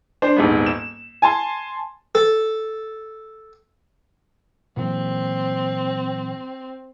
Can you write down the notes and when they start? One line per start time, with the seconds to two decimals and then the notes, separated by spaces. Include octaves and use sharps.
0.22 D4 C5
0.36 D#1 G#2 B3
0.66 E7
1.22 G#5 A5 C6
2.15 A4
4.77 A#2 E3 F#3 C4